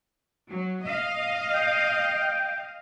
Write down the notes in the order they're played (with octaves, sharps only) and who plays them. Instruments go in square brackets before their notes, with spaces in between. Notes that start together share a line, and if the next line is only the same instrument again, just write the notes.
[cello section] F#3
D#5 F5
[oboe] G5